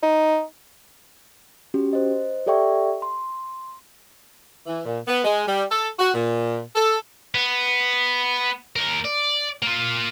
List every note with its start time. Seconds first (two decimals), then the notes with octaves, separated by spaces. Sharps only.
0.02 D#4
1.74 C#4 F#4 G4
1.93 C5 D#5
2.47 G4 A4 D5 E5 G5 C#6
3.02 C6
4.67 E3
4.85 A#2
5.07 B3
5.24 G#3
5.47 G3
5.70 A4
5.99 F#4
6.14 A#2
6.76 A4
7.35 B3
8.76 D#2 A#4
9.04 D5
9.62 A#3 F4